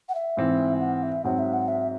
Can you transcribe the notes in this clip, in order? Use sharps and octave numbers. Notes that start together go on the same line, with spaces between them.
F#5
E5
G#2 E3 C4
F#5
E5
G#2 F#3 C4 F#5
E5
F#5
E5